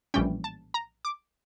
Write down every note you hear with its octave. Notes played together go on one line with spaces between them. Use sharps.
A#1 A2 E3 G3 C#4 G5
A5
A#5
D6